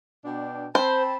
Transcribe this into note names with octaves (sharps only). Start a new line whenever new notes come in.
B2 D4 G5
C4 C5 A5 B5